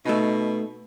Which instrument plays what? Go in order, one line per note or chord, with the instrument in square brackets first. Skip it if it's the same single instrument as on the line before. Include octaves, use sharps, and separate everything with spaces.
[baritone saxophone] B2 [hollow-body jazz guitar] A3 D#4